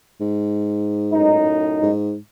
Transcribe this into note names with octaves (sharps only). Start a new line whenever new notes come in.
G#2
F#2 A2 D#4
G#2